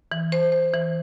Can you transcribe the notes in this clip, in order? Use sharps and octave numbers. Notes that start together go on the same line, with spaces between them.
E3
C5
C5
E3